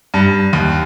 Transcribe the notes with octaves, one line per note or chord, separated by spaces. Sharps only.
G2
D#2